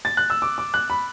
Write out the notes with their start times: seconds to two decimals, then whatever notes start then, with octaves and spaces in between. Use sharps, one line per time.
0.05 A6
0.17 F#6
0.30 E6
0.42 D6
0.58 D6
0.74 F#6
0.90 B5